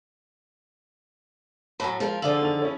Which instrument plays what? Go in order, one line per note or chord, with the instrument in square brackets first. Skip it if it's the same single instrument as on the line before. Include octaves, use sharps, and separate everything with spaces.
[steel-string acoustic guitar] A2 F#3 [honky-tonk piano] G#5 A5 B5
[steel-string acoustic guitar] F3 F4 [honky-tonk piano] G#3 A4 A#4
[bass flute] D3 [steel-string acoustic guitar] F3 G#4 A4 [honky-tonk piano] D5 F5 F#7
[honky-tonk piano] D#3 F7
C#4 E4 C#5